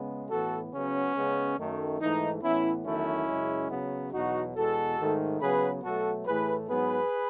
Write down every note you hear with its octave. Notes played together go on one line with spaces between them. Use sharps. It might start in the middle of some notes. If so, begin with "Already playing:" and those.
Already playing: C#3 G#3 B3
A2 E3 B3 F#4 A4
C#3 F#3 B3 C#4
C#3 G#3 B3
F#2 D#3 A3
G#2 E3 A3 D#4
A2 E3 B3 C#4 E4
E2 D#3 F#3 A3 C#4 E4
F#2 C#3 G#3
C#3 F#3 B3
E2 B2 F#3 D#4 F#4
E2 B2 G#3 F#4 A4
G#2 D#3 A3
C#3 F#3 B3 G#4 B4
B2 F#3 A3 F#4 A4
A2 E3 A3 G#4 B4
G#2 F#3 B3 G#4 B4